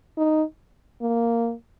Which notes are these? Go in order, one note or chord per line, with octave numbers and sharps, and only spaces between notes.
D#4
A#3